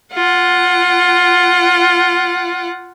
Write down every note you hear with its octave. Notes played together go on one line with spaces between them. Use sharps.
F4 F#5